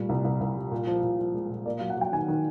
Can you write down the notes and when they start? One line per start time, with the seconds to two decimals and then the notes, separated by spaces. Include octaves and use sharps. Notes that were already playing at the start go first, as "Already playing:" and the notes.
Already playing: A#2 G3 A3
0.09 C2
0.24 C2
0.40 C2
0.56 G3
0.71 A#2
0.87 F3
1.03 A#2
1.19 F3
1.34 G#3
1.49 A#2
1.65 A#3 D5
1.79 F#3 F5
1.90 F#5
1.97 F#3 G5
2.13 D#3 G#5
2.28 D#3